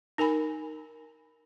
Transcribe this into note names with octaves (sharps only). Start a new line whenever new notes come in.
D#4 A#4 G#5 B5